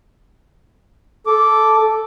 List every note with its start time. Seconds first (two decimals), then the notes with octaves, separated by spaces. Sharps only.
1.27 A4 D6